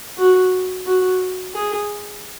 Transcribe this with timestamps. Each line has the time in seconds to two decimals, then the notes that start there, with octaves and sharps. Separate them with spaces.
0.18 F#4
0.86 F#4
1.54 G#4